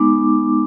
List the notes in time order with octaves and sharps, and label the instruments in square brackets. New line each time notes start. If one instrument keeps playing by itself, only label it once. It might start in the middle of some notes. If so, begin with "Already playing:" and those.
Already playing: [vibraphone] G#3 B3 D#4 D6